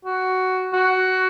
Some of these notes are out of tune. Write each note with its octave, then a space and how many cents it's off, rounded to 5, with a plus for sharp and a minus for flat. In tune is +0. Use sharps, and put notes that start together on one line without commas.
F#4 +10
F#4 +15